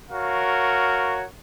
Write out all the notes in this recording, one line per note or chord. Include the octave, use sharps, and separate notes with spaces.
F#4 A#4 C#5 F5